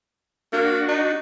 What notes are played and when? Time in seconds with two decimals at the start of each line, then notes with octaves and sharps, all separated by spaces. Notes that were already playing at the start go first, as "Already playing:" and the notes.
0.53 A#3 D4 F#4
0.88 D#4